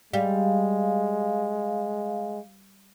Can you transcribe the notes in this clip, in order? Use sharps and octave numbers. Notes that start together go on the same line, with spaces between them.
G3 G#3 F5